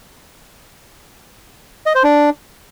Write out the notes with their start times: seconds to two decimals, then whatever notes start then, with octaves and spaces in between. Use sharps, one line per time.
1.86 D#5
1.95 C5
2.04 D4